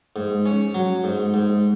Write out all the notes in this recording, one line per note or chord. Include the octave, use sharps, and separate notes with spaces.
G#2
C#4
F#3
G#2
G#2